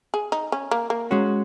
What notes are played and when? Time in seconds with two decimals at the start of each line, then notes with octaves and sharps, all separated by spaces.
0.14 G#4
0.32 D#4
0.52 C#4
0.71 A#3
0.90 A#3
1.11 G#3 C#4 F#4